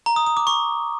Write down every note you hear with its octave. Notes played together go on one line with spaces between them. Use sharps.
A#5
D#6
D#6
D6
C#6